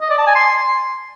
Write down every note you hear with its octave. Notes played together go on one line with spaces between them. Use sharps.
D#5
D5
A5
G#5
C6